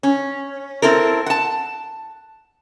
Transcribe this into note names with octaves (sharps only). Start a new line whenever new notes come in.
C#4
C4 E4 A4 A#4
F#5 A5